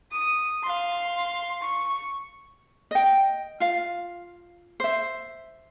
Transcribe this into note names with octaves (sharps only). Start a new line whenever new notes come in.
D#6
F5 C6
C#6
D#5 G5
F4 F5
C5 E5